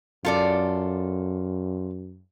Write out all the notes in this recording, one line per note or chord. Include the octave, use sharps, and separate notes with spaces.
F#2 F4 A4 D5